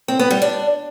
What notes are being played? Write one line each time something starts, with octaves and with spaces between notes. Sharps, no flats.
C4
B3
G3
D4